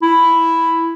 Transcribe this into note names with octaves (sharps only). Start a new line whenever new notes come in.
E4